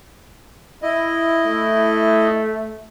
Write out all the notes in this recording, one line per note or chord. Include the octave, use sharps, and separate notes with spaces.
E4 D#5
A3